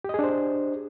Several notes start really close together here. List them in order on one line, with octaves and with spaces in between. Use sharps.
G4 D#5 G#4 D4 C5